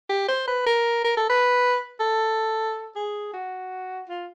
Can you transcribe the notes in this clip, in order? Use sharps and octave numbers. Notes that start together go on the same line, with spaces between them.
G4
C5
B4
A#4
A#4
A4
B4
A4
G#4
F#4
F4